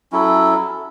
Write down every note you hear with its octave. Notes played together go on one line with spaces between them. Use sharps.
F#3 C#4 E4 A4